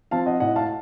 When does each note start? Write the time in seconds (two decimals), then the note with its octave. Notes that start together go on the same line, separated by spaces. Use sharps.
0.11 F3 C4 F5 A5
0.26 D#5 F#5
0.40 A2 D#5 F#5
0.56 F5 A5